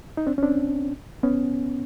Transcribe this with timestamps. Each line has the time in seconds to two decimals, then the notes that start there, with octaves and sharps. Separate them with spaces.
0.17 D#4
0.27 C4 D4
0.38 C#4
0.43 C4 D4
1.23 B3 C#4